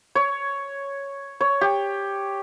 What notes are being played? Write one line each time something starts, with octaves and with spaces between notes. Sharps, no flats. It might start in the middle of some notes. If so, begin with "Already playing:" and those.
C#5
C#5
G4